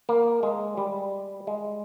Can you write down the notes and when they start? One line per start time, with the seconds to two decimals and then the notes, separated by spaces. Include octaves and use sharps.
0.09 A#3
0.43 G#3
0.77 G3
1.47 G#3